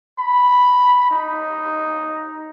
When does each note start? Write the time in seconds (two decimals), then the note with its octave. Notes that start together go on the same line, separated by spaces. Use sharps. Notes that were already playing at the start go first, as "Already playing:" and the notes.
0.19 B5
1.11 D#4